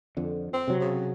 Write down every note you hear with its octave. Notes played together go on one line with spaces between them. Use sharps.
F2 D3
C4
C3 F#3
C#3